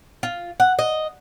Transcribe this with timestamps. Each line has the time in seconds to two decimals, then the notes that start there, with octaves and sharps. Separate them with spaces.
0.23 F4
0.60 F#5
0.79 D#5